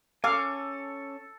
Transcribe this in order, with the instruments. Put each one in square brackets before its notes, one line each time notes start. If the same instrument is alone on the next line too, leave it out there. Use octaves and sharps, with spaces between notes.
[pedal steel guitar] C#4 G#5 [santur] A4 [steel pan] F5 [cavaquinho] D6